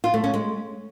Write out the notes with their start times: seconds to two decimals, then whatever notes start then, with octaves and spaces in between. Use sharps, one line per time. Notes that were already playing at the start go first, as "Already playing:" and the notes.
0.04 F4
0.14 A3
0.24 C#4
0.34 G#3